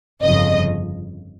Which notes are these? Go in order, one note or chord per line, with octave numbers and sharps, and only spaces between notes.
G1 F2 C#3 D#5